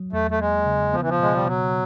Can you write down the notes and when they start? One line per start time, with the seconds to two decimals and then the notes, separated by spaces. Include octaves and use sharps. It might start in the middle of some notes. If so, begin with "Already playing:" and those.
Already playing: F#3
0.13 E2 A3
0.31 A3
0.40 G#3 A#3
0.66 C#3
0.93 F3 B3
1.01 E3
1.09 F3
1.19 B2 G#3
1.34 G3
1.46 B2 F#3